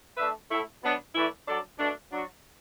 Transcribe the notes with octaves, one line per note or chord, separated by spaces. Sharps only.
A3 D4 B4 E5
A2 A3 E4
B2 F#3 B3 D4
E3 A3 E4 B4 D5
F#3 D4 A4 D5
B2 A3 D4
F#3 D4 F#4